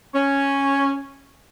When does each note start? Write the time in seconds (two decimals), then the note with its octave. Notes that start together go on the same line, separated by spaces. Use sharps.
0.15 C#4